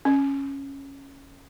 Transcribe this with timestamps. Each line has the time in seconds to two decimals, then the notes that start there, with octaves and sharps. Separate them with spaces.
0.05 C#4